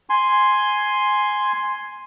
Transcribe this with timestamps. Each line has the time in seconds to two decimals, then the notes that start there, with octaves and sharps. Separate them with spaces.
0.10 G#5 C6